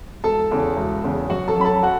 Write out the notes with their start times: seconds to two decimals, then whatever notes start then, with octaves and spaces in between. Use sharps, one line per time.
0.24 E1 A4 A5
0.51 E2 C#3
0.77 E1
1.04 E2 C#3
1.30 F#2 F#4 F#5
1.48 A4 A5
1.56 F#3 C#4 B5
1.65 A4 A5
1.83 F#4 F#5